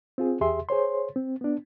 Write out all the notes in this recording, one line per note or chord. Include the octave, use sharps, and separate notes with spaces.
C4 F4 G#4
E2 G4 G#4 E5 C6
G#4 C5 C#5 C6
C4
B3 D4